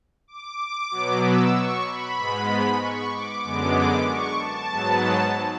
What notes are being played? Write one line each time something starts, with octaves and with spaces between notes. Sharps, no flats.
D6
D6
B2 F#3 B3
E6
C#6
B5
G#2 G#3 B3
C#6
D6
F#2 D3 G#3 B3 D6
C#6
A5
G#2 F#3 B3